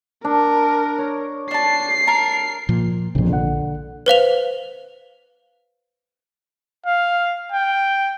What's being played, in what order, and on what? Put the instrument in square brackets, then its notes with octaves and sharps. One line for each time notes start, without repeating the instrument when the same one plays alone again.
[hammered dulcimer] D4 [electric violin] A#4
[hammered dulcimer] C#5
[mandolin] D4 A5 [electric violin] C7
[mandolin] A#4 A5
[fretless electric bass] A#2 F3
[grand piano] E1 F2 [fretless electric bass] A#1 A#2
[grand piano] D3 F#5
[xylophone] B4 C5 F5 F7
[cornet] F5
G5